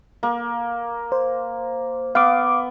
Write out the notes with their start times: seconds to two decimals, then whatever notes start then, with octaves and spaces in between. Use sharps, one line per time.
0.23 A#3
1.12 C5
2.15 B3 F5 D6